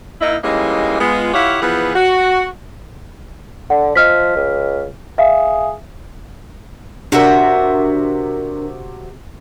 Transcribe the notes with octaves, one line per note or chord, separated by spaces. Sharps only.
A#3 D#4 E4
E3 G3 G#3 A#3 C#4 D#4
G#3 B3 F4
E4 F4 G4 C#5 F5 F#5
E3 F3 B3 G#4 B4
F#4
D3 F#5
F3 D#5 F6 B6
C#2
G#4 E5 F5
C3 D4 F#4 A#4 E5